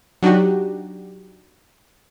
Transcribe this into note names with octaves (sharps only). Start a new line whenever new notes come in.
F#3 D4 D#4 F#4 G4